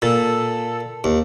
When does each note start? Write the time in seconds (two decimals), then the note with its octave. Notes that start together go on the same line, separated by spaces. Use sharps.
0.02 A#2 A4
1.04 D#2